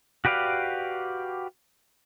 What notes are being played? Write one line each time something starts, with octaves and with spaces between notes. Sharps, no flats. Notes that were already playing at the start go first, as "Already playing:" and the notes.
F#4 G4 B4 D5 F5